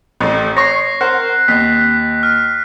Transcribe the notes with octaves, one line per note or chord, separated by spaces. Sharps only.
A1 A2
C#5 C#6 A#6 C7
A#4 C5 F#5 F#6
D#2 B6
F6